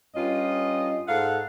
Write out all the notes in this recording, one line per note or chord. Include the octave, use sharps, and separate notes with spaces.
G2 C#4 F4 D#5
G#2 A4 F5 F#5